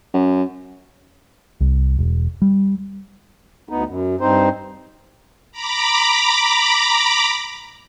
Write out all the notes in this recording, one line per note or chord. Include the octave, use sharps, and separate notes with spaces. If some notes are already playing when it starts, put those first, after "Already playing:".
F#2
C2
E1
G3
D2 B3 D#4
F#2
G2 C4 D#4 C5
A#5 B5 D6